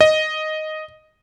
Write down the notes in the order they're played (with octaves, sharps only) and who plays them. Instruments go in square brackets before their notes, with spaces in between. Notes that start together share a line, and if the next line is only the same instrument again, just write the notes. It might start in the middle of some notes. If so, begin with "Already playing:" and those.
[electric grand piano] D#5